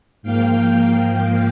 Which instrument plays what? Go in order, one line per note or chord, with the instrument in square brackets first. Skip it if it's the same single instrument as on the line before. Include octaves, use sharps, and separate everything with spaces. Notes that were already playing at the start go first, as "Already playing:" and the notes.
[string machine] G#2 F3 A#3 F5 G5